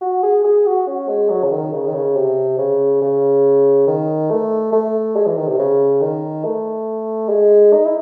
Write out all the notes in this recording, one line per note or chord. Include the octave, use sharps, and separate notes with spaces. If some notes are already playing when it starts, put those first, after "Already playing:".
F#4
G#4
G#4
F#4
C#4
G#3
F#3
C#3
D#3
C#3
D#3
C#3
C3
C#3
C#3
D#3
A3
A3
G#3
E3
D#3
C3
C#3
D#3
A3
G#3
D#4
E4